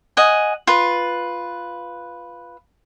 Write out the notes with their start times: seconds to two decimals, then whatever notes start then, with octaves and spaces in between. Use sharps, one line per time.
0.17 D#5 F#5 G#5
0.67 F4 B4